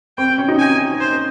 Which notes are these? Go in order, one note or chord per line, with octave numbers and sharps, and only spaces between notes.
C4 G5
C#4
D#4
G#5
C5